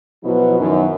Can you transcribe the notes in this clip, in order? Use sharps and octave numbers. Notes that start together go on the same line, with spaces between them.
B2 F3 F#3 B3 E4 F#4
F#2 D#3